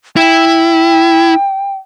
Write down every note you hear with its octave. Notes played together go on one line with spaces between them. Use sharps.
E4 G5